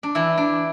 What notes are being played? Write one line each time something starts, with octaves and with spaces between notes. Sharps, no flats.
D4
E3 E4
D4